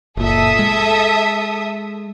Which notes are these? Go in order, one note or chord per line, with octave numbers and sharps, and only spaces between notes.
F#1 A#2 A4 E5 D#6
G#3